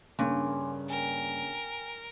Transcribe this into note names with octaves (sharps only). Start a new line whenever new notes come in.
G2 C#3 A#3 G#5 C6 D6
A#4 G5 G#5